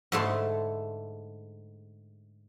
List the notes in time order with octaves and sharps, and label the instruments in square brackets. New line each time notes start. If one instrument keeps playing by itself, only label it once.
[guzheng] G#2 D3 A3 E4 A5 C6